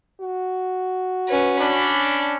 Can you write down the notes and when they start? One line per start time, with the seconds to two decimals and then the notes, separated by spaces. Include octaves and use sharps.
0.21 F#4
1.28 C#4 B4
1.60 C#4 D4 B5